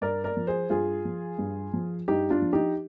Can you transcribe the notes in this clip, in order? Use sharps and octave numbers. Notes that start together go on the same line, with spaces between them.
G2 A#4 D5
A#4 D5
F3
G#4 C5
G2 F4 G#4
F3
G2
F3
G2 D#4 G4
D4 F4
F3
D#4 G4